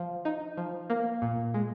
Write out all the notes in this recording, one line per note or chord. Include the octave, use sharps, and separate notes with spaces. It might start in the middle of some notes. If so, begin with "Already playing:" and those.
Already playing: F3
D#4
F3
A#3
A#2
G#3